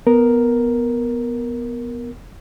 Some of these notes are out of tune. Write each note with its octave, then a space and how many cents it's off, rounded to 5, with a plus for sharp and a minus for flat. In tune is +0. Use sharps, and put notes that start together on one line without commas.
B3 -5 A#4 +0